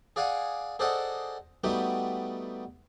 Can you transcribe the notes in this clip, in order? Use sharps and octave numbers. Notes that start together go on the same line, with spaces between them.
G#4 D5 F5 F#5 G#5
G#4 A4 C5 D5 D#5 F#5
G3 A3 B3 D#4 F#4 G4